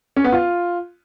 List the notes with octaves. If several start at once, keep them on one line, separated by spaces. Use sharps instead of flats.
C#4
B3
F4